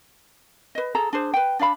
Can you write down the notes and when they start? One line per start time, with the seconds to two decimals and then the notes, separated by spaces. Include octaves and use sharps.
0.75 B4 D#5
0.95 G#4 A4 A#5
1.13 D4 G#4 C5
1.34 B4 G5
1.59 D4 D5 F5 B5